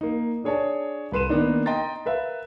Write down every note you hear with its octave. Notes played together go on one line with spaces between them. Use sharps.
A#3 D#4
D4 G#4 C#5 D5 A5
C2 A4 B4 C6 D#7 E7
D#3 A#3 B3 D4 D#4
D#5 G5 A#5 C6 A6
A#4 B4 E5 F5